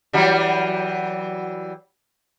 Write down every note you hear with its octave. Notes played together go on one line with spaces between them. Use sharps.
E3 F#3 G3